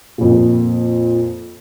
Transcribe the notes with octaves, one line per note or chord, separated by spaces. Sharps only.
F2 A#2